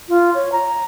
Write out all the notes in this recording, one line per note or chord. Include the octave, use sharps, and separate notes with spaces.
F4
C#5
A#5